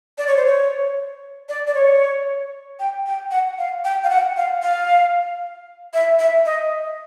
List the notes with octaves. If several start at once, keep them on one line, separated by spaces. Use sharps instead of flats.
D5
C#5
C5
C#5
D5
D5
C#5
G5
G5
F#5
F5
G5
F5
F#5
F5
F5
E5
E5
D#5